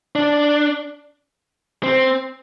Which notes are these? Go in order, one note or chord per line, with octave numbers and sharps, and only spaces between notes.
D4
C4